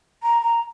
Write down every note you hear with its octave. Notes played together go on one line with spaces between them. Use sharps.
A#5
A#5